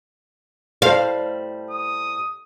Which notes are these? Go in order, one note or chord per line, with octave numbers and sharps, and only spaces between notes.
A2 G3 C5 F5
D#6